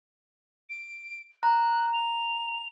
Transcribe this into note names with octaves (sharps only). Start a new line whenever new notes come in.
D7
A#5 F#6
F7